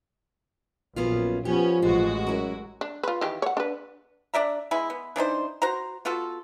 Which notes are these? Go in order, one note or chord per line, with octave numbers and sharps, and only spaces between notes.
A#1 F#2 B3 C#4 F4
F3 B3 C#4 G4
A1 G#3 F4 F#4
F#2 E4 A#4
D4
F4 B4
D#3 E3 G4
C#5 F#5
D4 B4
D4 D5 E5 A#5
G#3 B3 E4
B3
E3 D4 D#4 C5
F#4 C5 A#5
B3 F4 F#4 A4